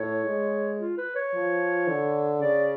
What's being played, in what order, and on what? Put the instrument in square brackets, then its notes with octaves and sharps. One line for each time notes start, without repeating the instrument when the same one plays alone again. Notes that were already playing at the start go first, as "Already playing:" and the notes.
Already playing: [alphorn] A2 [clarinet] C#5
[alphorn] G#3
[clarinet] F4
B4
C#5
[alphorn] F3
D3
[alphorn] C#3 [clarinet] D5